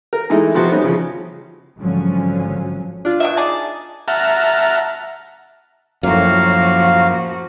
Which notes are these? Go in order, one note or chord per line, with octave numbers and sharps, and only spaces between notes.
A#4
E3 G#3 A3 D#4 E4
C3 F3 B3 F#4 C5
G3 B3 C#4 D#4
C#3 F3
G#1 D3 F3 F#3 C#4
D4 F4
B2 F#3 E5
D#4 G#4 D5 A5
E5 F#5 A5 A#5 F6
F#2 A2 F3 A#3 F#4 F5